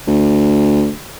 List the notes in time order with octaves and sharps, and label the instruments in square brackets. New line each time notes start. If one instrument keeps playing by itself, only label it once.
[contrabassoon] D2